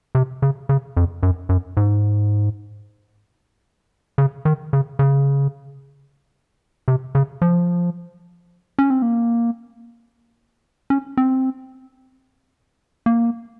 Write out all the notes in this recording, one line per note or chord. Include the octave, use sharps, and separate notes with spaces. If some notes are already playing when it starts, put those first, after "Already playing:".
C3
C#3
C#3
F2
F#2
F#2
G#2
C#3
D#3
C#3
C#3
C3
C#3
F3
C#4
C4
A#3
C#4
C4
A#3